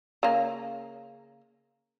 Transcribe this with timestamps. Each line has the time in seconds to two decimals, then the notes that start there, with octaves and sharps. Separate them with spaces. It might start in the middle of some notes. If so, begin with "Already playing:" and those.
0.23 C#3 A#3